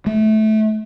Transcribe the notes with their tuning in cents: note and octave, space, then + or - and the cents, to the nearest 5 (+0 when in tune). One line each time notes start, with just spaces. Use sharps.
A3 -20